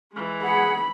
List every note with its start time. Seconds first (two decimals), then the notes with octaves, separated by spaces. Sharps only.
0.12 E3 G#3
0.42 G#4 F#5 B5